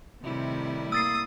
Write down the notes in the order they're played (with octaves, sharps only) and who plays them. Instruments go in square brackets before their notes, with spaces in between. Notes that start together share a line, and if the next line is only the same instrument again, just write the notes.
[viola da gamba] A2 G3 E4 [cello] C3 D#3
[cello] A#3 [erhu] D#6 [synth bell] E6 A6 C7